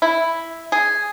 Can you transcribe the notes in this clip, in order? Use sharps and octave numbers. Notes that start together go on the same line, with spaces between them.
E4
G#4